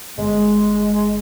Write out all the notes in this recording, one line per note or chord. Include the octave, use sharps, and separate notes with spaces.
G1 G#3